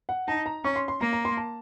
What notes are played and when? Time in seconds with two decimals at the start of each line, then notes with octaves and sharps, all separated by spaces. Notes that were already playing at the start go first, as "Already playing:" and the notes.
0.09 F#5
0.28 D#4 A5
0.46 A#5
0.64 C#4 C#6
0.76 C6
0.88 C6
1.00 A#3 A#5
1.13 A#5
1.25 C6
1.37 A5